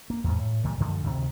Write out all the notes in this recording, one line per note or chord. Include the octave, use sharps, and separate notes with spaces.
A#3
E2 G#2
A2
C#2 A#2 E3 G3
F#2 D3 F3 G#3
D2 C3 D#3